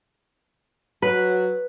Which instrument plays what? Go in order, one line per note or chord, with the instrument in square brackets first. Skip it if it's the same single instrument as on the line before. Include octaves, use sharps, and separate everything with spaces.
[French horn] F#3 [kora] B4